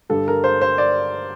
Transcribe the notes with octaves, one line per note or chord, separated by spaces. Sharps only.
G2 D3 G3 A4
A#4
C5
C5
D5